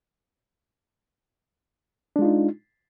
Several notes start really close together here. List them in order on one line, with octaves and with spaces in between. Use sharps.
D4 G#3 F4 D#4